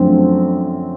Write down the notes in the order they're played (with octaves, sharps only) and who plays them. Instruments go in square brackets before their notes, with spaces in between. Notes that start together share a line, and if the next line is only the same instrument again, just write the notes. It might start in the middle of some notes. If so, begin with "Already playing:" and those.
Already playing: [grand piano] F#2 D3 F3 A3 C4